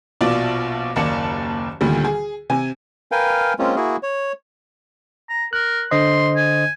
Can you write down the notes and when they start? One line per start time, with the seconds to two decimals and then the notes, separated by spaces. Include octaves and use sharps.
0.21 A#1 B2 F4 D5 A5
0.96 F#1 D#2 A#3 D5 A5 C#7
1.81 D2 A#2 D3 D#3 G3
2.05 G#4
2.50 C3 G#5
3.12 A#4 B4 F5 G5 G#5
3.59 G#3 A#3 C4 C#4 F4
3.76 A#3 E4 F#4 G#4
4.03 C#5
5.29 A#5
5.53 A#4 F#6
5.91 D3 C5 D#5 C6
6.36 G#5